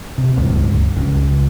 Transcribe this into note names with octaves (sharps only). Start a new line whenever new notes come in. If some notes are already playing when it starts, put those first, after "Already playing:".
C3
D1 C#2 G2
C#2 C#3